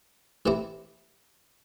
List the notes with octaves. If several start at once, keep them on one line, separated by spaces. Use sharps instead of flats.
E3 A3 C4 E4 G4